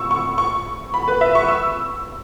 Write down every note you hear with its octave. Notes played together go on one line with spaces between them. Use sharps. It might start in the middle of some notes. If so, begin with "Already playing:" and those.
Already playing: C#6 E6
C#6
C#6
B5
B4
E5
C#6
E6